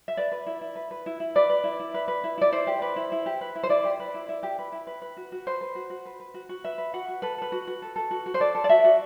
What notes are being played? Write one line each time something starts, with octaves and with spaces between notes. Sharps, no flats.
E5
B4 D5
B4
E4
E4
B4
B4
E4
E4
B4 D5
B4
E4
E4
B4
B4
E4
E4 D5
E4 C5
G4
B4
E4
E4
G4
B4
E4
C5
E4 D5
G4
B4
E4
E4
G4
B4
E4
B4
B4
F#4
F#4
B4 C5
B4
F#4
F#4
B4
B4
F#4
F#4
B4 E5
B4
F#4 F#5
F#4
A4 B4
A4 B4
F#4
F#4
A4
A4
F#4
F#4
C5
A4 D5
A4
D5
F#4 E5
F#4